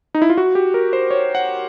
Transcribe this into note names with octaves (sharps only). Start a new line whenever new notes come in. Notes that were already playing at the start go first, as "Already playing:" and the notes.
D#4
E4
F4
F#4
G4
A#4
C5
C#5
F#5